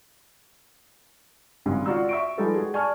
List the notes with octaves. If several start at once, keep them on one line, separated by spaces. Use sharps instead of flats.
G#1 G#2 C#3 G3
F4 F#4 D5 A#5 E6
E5 C#6 D7
F3 G3 G#3 D#4 A4 B4
F#4 G#4
D5 G#5 A5 C#6 F6